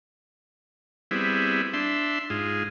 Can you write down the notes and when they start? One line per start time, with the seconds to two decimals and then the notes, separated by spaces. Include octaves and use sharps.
1.11 G3 B3 C4 E4 G#4
1.73 D4 E5 C6
2.30 G#2 F4 G#4